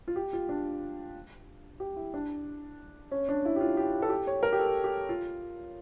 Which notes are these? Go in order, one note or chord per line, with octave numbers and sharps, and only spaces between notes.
F4
G4
F4
D4
G4
E4
D4
C#4
D4
E4
G4
F4
G4
A4
G4
C#5
A#4
G4
A4
G4
F4